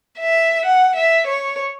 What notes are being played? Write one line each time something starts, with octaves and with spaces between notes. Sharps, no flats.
E5
F#5
E5
C#5